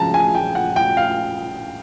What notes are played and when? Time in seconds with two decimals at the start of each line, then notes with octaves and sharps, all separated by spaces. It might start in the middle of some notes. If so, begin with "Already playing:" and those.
Already playing: C#3 F3 G#3 A5 A#5
0.14 G#5
0.35 G5
0.55 F#5
0.76 G5
0.97 F5